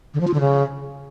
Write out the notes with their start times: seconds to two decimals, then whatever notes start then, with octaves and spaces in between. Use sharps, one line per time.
0.14 D3
0.21 F3
0.27 F4
0.34 D3
0.40 C#3